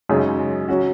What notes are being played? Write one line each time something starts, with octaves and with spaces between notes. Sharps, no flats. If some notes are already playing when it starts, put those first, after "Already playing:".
F#2 C#3 G#3 D#4 G#4
F#3 C#4 F#4